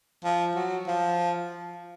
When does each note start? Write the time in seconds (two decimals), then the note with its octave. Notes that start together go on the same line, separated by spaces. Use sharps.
0.24 F3
0.56 F#3
0.87 F3